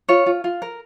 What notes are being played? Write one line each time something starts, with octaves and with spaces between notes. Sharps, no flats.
F4 C#5
F4
F4
A#4